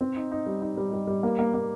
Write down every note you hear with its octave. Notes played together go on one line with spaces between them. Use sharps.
C4
D#4
D#4
G3
D#4
G3
G3
G3
A#3
A#3
A#3